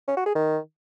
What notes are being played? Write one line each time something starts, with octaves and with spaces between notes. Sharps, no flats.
C#4
F#4
G#4
D#3